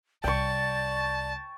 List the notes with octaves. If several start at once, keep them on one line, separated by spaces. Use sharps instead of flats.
C2 D5 G5 A5 C#6